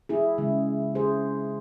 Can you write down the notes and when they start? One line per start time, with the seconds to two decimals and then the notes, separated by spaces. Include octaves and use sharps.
0.09 E4 G#4
0.38 C#3 G#3
0.95 G#4 C5